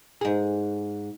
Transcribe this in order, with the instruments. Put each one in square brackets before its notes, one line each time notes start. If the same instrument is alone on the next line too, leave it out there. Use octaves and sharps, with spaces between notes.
[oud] G#2 G#4